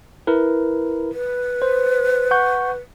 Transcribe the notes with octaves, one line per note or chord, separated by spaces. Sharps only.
E4 A#4 B4
B4
C5
F#5 C#6 G6